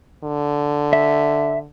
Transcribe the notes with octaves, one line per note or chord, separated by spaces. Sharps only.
D3
E5